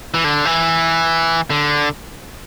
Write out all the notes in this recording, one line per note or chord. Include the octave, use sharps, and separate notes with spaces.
E3
D3
E3
D3